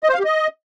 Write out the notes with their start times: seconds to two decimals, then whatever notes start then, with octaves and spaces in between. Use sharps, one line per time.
0.04 D#5
0.09 C5
0.14 F5
0.20 G4
0.25 D#5